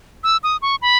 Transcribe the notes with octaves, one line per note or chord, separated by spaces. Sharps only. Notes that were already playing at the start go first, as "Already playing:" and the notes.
E6
D#6
C#6
B5